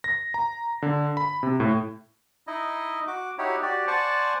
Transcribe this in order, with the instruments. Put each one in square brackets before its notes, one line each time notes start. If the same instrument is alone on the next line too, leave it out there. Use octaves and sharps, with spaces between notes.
[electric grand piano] A#6
A#5
D3
B5
C3
A2
[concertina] D#4 E4 D#5
F#4 D6
D#4 E4 F#4 G4 C#5
F#4 G4 D5
C5 D5 F#5 G#5 A5 C#6